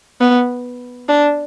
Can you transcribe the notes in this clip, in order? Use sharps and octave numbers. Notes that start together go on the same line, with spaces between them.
B3
D4